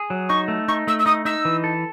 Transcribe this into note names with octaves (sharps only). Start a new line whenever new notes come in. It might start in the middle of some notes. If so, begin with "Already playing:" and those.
Already playing: G#4
F#3
D#4 C#6
A3
D#4 C#6
A3 E6
E6
D#4 D#6
D#4 E6
E3
A4